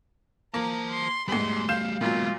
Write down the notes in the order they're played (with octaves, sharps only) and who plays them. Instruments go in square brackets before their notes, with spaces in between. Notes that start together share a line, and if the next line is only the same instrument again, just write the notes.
[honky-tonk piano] A#3 [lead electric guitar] C5 A5 [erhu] A#5
[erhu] C6
[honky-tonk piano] E2 G#2 [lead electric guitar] G3 A3 [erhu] C6
[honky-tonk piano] F5 G6 E7
[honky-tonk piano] A#2 F#3 [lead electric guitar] G#3 B3 [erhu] F4